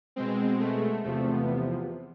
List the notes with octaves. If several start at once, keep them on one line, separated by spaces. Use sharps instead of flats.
B2 G#3 C4
A3
E2 C3 F3 A3
B3